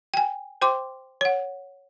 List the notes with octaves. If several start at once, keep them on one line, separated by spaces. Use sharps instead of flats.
G5 G#5
C5 G5 C6 D6
C#5 F#5